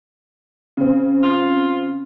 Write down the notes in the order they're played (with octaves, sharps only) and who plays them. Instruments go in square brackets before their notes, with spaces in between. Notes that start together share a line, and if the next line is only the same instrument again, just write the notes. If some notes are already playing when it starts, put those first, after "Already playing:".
[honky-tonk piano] C#3 C4
[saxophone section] F4